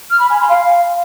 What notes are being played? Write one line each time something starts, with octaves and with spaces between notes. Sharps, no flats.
F6
B5
G#5
C6
F5